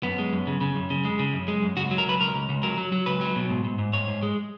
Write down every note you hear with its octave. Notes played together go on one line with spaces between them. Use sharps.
F#2 B3
G#3
F#2
C#3
C#3
F#2
C#3
G#3
C#3
F#2
G#3
F#2
C#2 F#4
F#3
A#4
C#2 B4
C#2 A#4
C#2
C#2
F#3 A#4
F#3
F#3
C#2 B4
F#3
B2
G#2
G#2
G#2
G#2 C#5
G#2
G#3